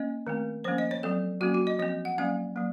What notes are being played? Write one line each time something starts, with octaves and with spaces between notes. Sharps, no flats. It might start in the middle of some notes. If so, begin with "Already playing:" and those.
Already playing: A#3 C#4 D#5
D#3 A3 C4
F3 A#3 C#4 C5
D#5
C#5
F#3 C4 A4
F#3 A#3 C#4 F#4
F#4
D#5
F3 C4 D#5
F#5
F#3 A#3 C#4 F5
F#3 A#3